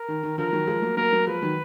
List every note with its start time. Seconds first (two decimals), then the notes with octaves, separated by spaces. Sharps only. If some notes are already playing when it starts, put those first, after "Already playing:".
Already playing: A#4
0.08 D#3
0.23 D#3
0.38 D3 F3 A#4
0.53 D#3 F#3
0.67 F3 G#3
0.82 F#3 A#3
0.97 F#3 A#3 A#4
1.12 F#3 A#3
1.27 F3 G#3 B4
1.42 D#3 F#3